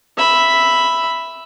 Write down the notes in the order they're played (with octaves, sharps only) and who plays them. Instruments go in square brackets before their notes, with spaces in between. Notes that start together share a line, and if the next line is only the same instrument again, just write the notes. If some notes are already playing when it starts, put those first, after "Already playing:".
[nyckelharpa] E5 B5